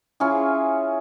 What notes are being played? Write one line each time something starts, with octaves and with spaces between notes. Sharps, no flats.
C#4 E4 F4 G#4